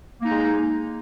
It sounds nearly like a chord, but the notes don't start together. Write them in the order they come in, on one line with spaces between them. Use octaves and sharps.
A#3 D#4 G#3